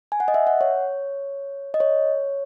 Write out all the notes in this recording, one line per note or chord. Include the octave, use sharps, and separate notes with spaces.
G#5
F#5
D#5
E5
F#5
C#5
D#5
C#5